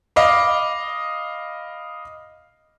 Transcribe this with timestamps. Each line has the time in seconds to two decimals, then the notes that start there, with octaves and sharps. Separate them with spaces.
0.16 D#5 F5 B5 D6